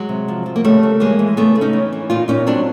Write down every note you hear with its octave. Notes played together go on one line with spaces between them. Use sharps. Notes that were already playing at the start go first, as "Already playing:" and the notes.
Already playing: F#3 G#3
C3
F3
F3
A#3
C#3 G3 A3
C#3
E3 G#3 A#3
E3
C#3 A3 B3
C#3
C#4 D#4
E3
E3
A#2 D#4 F4
A#2 C#4 D#4
F#3 C4 D4